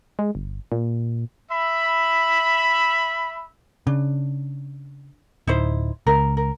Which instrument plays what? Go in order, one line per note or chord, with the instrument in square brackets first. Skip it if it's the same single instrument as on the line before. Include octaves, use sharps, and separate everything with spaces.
[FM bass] G#3
G1
A#2
[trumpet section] E5 B5
[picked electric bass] C#3 [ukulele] D4
[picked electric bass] D1 [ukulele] D#4 E4 C5
[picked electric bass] C#2 [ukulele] A#4
[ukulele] A#4